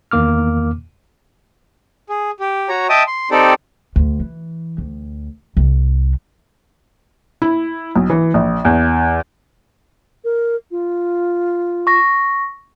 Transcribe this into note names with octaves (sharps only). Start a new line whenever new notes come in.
E2 D#3 A#3 D6 F6
G#4
G4
F#4 C#5 A#5
D#5 E5 G5 A5 D#6
C6
C4 D#4 G4 A4 D5
D2
E3
D2
C2
E4
B1
E3
A#1
E2
A#4
F4
C#6 A#6